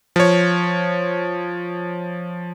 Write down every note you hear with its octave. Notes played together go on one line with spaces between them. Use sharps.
F3 C#5